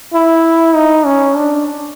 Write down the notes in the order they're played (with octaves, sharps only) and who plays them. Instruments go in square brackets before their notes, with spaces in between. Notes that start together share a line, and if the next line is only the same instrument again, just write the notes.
[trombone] E4
D#4
C#4
D4